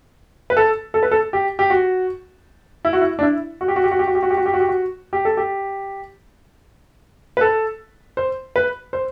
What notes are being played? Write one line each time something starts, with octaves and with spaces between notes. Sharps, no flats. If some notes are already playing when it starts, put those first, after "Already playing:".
B4
A4
A4
B4
A4
G4
G4
F#4
E4
F#4
E4
D4
E4
F#4
G4
F#4
G4
F#4
G4
F#4
G4
F#4
G4
F#4
G4
F#4
G4
F#4
G4
A4
G4
B4
A4
C5
B4
C5